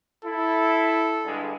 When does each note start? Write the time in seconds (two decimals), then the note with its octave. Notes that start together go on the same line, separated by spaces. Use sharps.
0.25 E4 A4
1.25 G2 D3 G#3